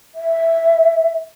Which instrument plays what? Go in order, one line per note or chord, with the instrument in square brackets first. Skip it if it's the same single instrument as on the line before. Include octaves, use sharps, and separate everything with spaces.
[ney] E5